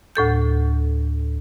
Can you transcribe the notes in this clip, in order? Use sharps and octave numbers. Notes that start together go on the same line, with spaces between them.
D2 A2 A4 G6